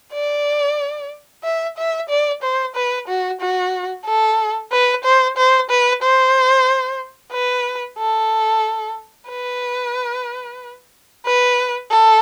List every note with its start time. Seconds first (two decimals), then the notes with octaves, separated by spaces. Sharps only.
0.13 D5
1.44 E5
1.77 E5
2.09 D5
2.42 C5
2.75 B4
3.08 F#4
3.41 F#4
4.05 A4
4.72 B4
5.04 C5
5.37 C5
5.70 B4
6.03 C5
7.32 B4
7.98 A4
9.30 B4
11.26 B4
11.91 A4